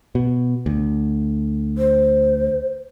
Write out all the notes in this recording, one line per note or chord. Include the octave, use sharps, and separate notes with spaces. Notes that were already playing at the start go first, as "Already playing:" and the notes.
B2
D2
C5